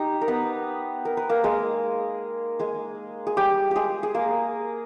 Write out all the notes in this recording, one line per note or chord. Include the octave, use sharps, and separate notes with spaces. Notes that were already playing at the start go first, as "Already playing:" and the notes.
Already playing: D#4 G4
A#4
B3 B4
A#4
B4
A#3 A#4
G#3 G#4
G#3 G#4
G#4
G3 G4
G#3 G4 G#4
G#4
A#3 A#4